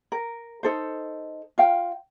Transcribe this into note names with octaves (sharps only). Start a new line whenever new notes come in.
A#4
D#4 A4 C5
F4 F5 G5